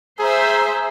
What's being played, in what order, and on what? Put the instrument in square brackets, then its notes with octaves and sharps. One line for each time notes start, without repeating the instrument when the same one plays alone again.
[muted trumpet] G#4 [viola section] C5 E5 [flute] A#5